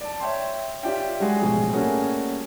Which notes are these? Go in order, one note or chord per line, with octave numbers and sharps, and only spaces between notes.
D5 A5
C#5 E5 G5 C6
F4 G4 C#5 D5 E5 G5
G3 G#3 F#4 G#4
A1 B2 F3 G#3 G#4
G3 A3 A#3 C#4 F#4 G#4